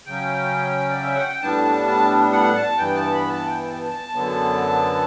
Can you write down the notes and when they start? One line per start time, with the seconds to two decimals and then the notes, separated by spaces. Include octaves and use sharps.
0.06 C#3 F#3 C#4 G5
0.89 D5
1.03 E5
1.15 F#5
1.29 G5
1.42 A2 G3 B3 D4 A5
1.64 A5
1.87 A5
2.32 F#5
2.55 A5
2.78 G2 E3 B3 G5
2.95 A5
3.11 B5
3.28 A5
3.46 G5
3.68 A5
3.90 A5
4.14 F#2 D3 F#3 B3